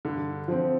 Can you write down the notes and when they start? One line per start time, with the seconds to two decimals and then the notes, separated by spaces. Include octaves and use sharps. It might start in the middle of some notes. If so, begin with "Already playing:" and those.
0.05 G2 D3
0.48 F3 C4